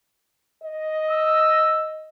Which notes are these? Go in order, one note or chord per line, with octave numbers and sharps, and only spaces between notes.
D#5
E6